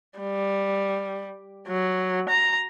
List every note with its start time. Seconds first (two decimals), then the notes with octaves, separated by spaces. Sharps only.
0.19 G3
1.68 F#3
2.29 A#5